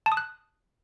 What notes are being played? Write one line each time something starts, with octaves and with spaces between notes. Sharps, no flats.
A5
D#6
F#6